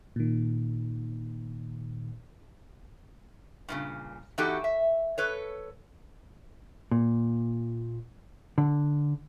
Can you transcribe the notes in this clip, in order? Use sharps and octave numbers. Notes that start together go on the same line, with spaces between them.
A#2 D#3
G2 A#2 C#3
E3 B3 D#4 F#4 G4 A4
E5
A4 B4 C#5
A#2
D3